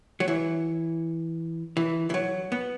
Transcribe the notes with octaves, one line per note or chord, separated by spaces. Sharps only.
F#3
E3
E3
E3
F#3
B3